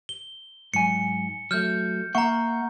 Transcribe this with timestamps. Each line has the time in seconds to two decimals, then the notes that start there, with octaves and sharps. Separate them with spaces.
0.09 G7
0.74 G#2 F#3 G#5 C#7
1.51 F#3 A3 F6 G6
2.15 A#3 E5 F#5 A#5 C#6